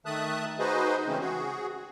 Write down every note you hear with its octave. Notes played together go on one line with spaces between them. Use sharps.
D#3 A3 E5 A5 D#6 F#6
D#4 F#4 G#4 B4 C5 D#5
C#3 E3 G#3 A3 C4 C#4
F#4 G#4